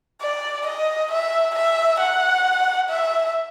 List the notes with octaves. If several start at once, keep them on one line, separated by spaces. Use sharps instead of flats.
D5
D#5
E5
E5
F#5
E5